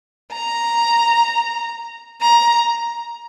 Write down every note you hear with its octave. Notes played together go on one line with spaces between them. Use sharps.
A#5
A#5